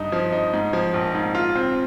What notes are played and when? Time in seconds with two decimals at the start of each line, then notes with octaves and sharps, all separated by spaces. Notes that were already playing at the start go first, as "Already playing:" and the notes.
Already playing: G2 D#4
0.12 F3
0.32 D#4
0.53 G#2
0.73 F3
0.94 A#1
1.14 G#2
1.35 F4
1.55 C4